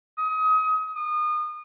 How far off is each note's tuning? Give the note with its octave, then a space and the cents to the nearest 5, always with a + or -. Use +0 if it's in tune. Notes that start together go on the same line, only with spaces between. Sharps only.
D#6 +30
D#6 -30